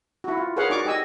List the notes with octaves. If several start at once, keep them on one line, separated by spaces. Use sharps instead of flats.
E4 F#4
F4
G#4 A#4 B4 C#5 F5 F#5
D#4 F#4 D5 C#6 D6
G4 D#5 G#5 E6